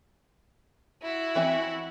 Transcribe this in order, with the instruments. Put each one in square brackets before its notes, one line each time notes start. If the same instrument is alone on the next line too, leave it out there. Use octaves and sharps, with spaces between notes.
[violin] E4 F#4
[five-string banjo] E3 C4 E5